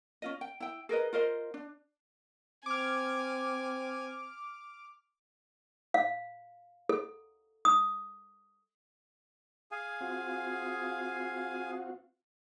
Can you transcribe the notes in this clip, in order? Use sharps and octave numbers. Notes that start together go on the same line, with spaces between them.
C#4 F4 D#5
G5
E4 G5
G#4 A#4 B4 D#5
F4 A#4 C5 D#5
D4
C4 G#5 D6 F6
F5
A4
D#6
G#4 F5 G#5
C4 F4 F#4